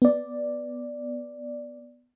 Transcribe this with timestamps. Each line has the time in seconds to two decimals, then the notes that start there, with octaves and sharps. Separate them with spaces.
0.02 B3 D5